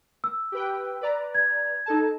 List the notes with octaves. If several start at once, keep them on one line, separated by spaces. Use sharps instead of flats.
E6
G4 B4 G5
B4 D5 A#5
G#6
D#4 A4 A5